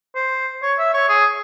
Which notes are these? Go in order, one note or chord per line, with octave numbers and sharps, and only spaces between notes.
C5
C#5
E5
C#5
G#4